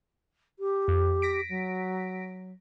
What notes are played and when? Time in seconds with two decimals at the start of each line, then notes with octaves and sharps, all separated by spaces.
0.59 G4
0.88 F2
1.22 A#6 B6 D7
1.49 F#3